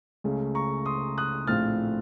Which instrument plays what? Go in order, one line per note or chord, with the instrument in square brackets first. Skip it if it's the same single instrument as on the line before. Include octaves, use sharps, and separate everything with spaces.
[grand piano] C#2 C#3 A3 C#4
A#5 C#6
C6 D#6
D#6 F#6
A#1 A2 A3 C4 F4 F6 A6